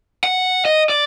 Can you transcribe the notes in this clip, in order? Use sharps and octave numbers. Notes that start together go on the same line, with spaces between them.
F#5
D#5
D5